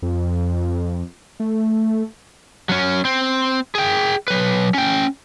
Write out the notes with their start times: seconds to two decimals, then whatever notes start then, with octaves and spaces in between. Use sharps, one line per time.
0.02 F2
1.40 A3
2.69 F#3 C#4
3.05 C4
3.75 G#4 G5
4.28 F#3 B4
4.74 C#4 G5